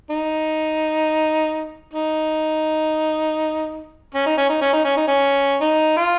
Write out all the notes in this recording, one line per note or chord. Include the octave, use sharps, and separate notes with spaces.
D#4
D#4
C#4
D#4
C#4
D#4
C#4
D#4
C#4
D#4
C#4
D#4
F4